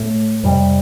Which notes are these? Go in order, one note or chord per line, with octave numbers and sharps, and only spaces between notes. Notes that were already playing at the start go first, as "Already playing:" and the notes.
Already playing: A2 A3
F2 C3 G3